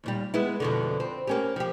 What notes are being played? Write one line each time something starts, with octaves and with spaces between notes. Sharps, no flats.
D#2 A#2 G3
G#3 B3 E4
F2 B2 D3
C4
A#3 C#4 G4
F3 G4